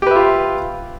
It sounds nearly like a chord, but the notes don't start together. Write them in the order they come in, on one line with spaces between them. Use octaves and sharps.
G4 B4 E5 F4